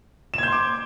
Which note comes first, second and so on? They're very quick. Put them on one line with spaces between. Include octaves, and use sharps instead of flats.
E7 G#6 G6 C6 D6